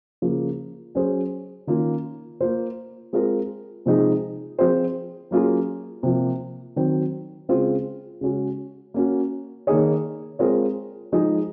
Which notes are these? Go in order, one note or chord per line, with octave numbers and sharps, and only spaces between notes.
C#3 F3 A#3
F#3 C#4 G#4 C5
D#3 A#3 C#4 F4
A#3 F4 C5
G#3 C4 F4 A#4
C3 F3 G#3 D#4 G#4
F3 C4 F4 G#4 C5
F#3 A#3 C#4 F4 G#4
C3 F3 A#3
D#3 F#3 C4
C#3 G#3 C4 F4 C5
C#3 G#3 C#4 F#4
A#3 C#4 F#4
D#3 A#3 D#4 G#4 C#5
G#3 C4 F4 A#4 C#5
F3 G#3 D#4 G#4